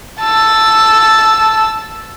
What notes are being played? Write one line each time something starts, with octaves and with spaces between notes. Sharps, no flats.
A5 E6